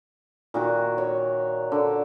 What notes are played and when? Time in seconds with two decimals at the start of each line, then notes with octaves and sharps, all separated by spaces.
0.54 A#2 D#3 F#4
0.98 C#5
1.72 D3